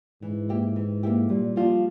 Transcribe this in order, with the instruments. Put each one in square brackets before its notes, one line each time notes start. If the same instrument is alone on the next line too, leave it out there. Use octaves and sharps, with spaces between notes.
[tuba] G#2 [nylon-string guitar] E3
[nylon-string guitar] A#3 E4 G4
E3
A#3 E4 G4
[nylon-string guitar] A#2 [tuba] G3
[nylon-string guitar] F3 A#3 F4